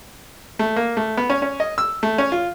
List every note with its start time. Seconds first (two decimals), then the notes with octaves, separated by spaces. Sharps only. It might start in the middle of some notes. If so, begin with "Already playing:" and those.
0.59 A3
0.76 A#3
0.97 A3
1.17 B3
1.30 C#4
1.42 C#4
1.60 D#5
1.78 E6
2.03 A3
2.18 C#4
2.32 F4